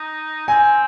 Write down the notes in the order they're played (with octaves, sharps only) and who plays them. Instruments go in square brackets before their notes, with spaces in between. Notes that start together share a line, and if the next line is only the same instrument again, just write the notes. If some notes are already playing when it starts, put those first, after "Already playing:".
Already playing: [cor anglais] D#4
[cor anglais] C4 [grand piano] G#5